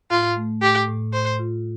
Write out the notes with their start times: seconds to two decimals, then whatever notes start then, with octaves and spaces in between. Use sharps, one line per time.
0.10 A2 F4
0.37 A3
0.62 A2 G4
0.88 A2
1.13 A2 C5
1.39 F4